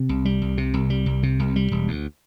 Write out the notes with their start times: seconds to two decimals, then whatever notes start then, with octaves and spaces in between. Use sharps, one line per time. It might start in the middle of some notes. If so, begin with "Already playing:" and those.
Already playing: C3
0.09 C2
0.25 G3
0.42 C2
0.58 C3
0.74 C2
0.90 G3
1.06 C2
1.23 C3
1.39 C2
1.56 G3
1.72 E1
1.88 D2